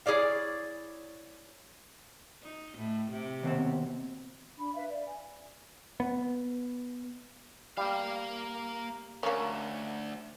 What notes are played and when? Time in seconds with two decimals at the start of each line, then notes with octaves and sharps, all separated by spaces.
0.06 E4 G#4 C#5 D5 F5
2.42 D#4
2.77 A2
3.10 C3
3.43 D#2 B2 C4
4.57 D4 B5
4.74 B4 E5 F5
4.88 D5
5.05 G#5
6.00 B3
7.77 G3 A#3 F5
9.23 D2 A#3 C#4